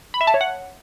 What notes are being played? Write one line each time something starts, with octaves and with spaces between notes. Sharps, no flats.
B5
E5
A5
C#5
F#5